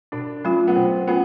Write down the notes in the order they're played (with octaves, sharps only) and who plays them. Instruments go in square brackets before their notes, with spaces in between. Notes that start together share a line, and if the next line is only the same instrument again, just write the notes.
[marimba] B2 [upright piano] D4
[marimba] F#3 A3 C#4 F4
[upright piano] B3
[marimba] B2 [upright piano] C4
[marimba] A3 C#4 F4 [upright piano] B3